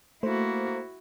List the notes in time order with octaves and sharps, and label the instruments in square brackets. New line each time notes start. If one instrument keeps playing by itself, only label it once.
[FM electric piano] A3 C5 [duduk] A#3 [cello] E4 F#4